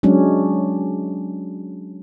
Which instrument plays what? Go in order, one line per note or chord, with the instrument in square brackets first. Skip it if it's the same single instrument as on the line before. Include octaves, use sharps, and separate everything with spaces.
[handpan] F#3 G#3 C#4 D4